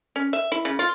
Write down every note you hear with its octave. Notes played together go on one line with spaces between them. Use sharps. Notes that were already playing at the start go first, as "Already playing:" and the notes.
C#4
E5
E4
C#3
F4